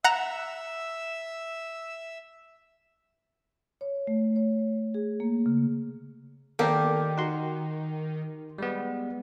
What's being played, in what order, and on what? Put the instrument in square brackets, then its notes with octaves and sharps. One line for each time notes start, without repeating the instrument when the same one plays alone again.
[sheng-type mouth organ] E5 E6 [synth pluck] F#5 A#5
[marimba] C#5
A3
C#5
G#4
A#3
C#3
[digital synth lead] D#3 [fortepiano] A#3 A#4 [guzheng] G4 [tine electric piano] A4 D5 G5
[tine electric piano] D#4 C6 [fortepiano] F#4
[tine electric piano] G3 G#3 B3